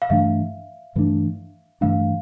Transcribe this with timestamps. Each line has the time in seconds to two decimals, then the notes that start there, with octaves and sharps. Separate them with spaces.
0.02 F5
0.10 G2 E3 A3 D4 E5
0.95 G2 E3 A3 D4
1.81 G2 E3 A3 D4 F5